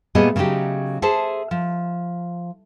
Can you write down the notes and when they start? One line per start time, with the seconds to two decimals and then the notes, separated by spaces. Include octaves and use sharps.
0.15 A#2 G3 A3 B3 G#4 D#5
0.36 C#3 F#3 A3 D#4 G4
1.02 G#4 A4 C5 E5 A5
1.51 F3